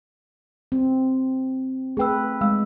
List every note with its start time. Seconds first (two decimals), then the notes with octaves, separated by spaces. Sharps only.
0.72 C4
1.97 A3 G#4 B4 G5 E6
2.41 G#3 F5 E6